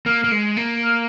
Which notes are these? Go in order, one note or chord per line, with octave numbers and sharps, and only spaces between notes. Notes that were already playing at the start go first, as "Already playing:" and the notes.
A#3 F6
A#3
G#3
A#3
F6